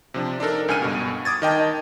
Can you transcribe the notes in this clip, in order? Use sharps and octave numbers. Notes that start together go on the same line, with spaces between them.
C3 F3 D4
D4 D#4 A4 A#4
C#2 G#5 F6 D#7
G2 B2
D6 D#6 G#6 A6
D#3 D#5 G5 A5